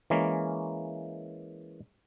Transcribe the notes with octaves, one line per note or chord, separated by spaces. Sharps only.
E3 G#3 A#3 C#4